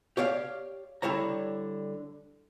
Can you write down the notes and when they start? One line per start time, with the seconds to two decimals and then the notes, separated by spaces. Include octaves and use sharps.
0.17 G4 C#5 D5 F5
1.02 D3 G3 E4 C#5 A#5